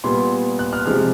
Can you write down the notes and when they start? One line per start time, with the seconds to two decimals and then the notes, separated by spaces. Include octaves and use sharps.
0.04 A#2 G3 B3 C6
0.59 F#6
0.73 F6
0.86 C3 F3 G#3 F6